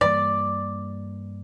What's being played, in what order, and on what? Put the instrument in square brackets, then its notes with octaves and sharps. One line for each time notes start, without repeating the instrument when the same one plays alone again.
[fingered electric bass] G2 E3 G3 A#3 [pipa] D5